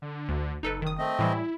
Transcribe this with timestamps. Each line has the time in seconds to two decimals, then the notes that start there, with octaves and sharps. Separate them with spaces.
0.02 D3
0.29 D2
0.63 F#1 D#4 A4 B4
0.82 D#3 D#6
0.98 A3 C4 D#5
1.19 A2 E3 G3 E4